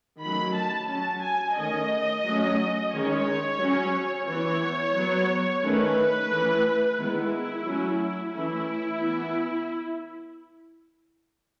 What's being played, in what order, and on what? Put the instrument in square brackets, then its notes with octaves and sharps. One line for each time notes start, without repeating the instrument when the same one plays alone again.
[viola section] D#3 F#3 A3 C#4 B5
A5
F#3 C#4 A5
G#5
D#3 A3 C#4 D#5
F#3 A3 C#4
D#3 G#3 C#4 C#5
F#3 C#4
E3 B3 C#5
F#3 B3
D#3 A3 C#4 B4
E3 A3 C#4
D#3 G#3 B3 E4
F#3 A3 C#4
E3 A3 C#4 E4
E3 B3